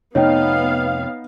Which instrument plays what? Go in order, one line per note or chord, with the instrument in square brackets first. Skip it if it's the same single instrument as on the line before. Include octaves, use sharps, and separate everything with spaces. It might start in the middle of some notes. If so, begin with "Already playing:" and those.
[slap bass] F2 C3 A3 [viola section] B3 F5 [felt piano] D#4 [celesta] C#5 G5